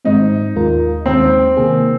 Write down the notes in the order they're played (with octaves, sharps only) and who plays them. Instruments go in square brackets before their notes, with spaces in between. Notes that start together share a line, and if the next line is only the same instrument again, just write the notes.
[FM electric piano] G#2 D#3 G#3 C4 [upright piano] D#4
[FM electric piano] D#2 D#3 G#3 F4 A#4
[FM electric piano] D#2 D#3 G#3 [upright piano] C4
[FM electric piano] C3 D#3 A#3 G#4